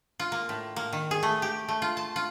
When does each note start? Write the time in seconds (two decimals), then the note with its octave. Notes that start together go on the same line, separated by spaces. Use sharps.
0.20 F4
0.32 A#3
0.49 A2
0.76 A#3
0.93 D#3
1.11 G#4
1.23 A3
1.42 G4
1.68 A3
1.82 F4
1.97 A5
2.16 F4